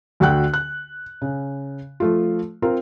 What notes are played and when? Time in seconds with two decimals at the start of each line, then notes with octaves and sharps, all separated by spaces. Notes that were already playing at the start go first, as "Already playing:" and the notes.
0.20 D2 D3 F#4 G5 F#6
0.54 F#6
1.22 C#3
2.00 F3 A3 F4
2.62 C4 F4 A#4